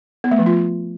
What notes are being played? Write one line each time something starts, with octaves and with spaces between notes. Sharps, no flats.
B3
A3
F3
F4